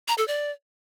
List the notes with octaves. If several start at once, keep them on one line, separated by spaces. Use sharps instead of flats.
A#5
A4
D5